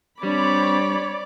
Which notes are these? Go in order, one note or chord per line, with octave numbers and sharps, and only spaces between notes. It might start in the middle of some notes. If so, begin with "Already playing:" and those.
G3 C4 D4 C#5 D5 B5